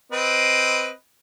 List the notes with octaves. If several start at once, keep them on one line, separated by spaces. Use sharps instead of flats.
C4 B4 D#5